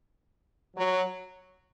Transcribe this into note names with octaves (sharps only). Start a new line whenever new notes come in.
F#3